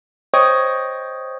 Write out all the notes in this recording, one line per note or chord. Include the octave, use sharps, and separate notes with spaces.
C5 C#5 D#5 G5 C#6 D#6